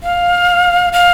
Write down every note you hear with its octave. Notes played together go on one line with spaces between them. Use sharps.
F5
F5